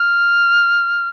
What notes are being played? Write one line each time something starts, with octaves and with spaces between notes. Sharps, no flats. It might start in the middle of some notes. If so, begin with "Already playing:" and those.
Already playing: F6